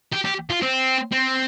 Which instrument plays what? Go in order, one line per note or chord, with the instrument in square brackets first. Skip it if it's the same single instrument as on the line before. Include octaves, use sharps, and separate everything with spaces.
[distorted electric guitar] G4
G4
F4
C4
C4